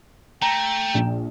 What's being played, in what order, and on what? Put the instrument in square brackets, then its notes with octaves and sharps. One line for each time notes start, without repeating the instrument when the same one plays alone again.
[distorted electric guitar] A3 [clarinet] G5 [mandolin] A#5
[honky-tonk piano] A#1